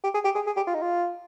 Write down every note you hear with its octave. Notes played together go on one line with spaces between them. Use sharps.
G4
G#4
G4
G#4
G#4
G4
F4
D#4
F4